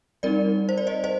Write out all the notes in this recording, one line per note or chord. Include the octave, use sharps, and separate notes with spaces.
G3 C4 D#4 A#4 D5
C5
D5
C5 D#5
C5 D#5